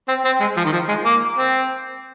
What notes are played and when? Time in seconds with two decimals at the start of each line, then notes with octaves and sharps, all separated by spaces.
0.08 C4
0.25 C4
0.41 G#3
0.57 F3
0.65 D#3
0.73 F3
0.89 G#3
1.05 A#3
1.37 C4